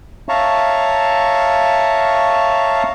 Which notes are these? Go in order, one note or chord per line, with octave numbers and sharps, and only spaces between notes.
C#5 E5 F5 A5 A#5 C#6